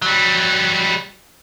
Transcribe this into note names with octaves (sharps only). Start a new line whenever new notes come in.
F#3 G3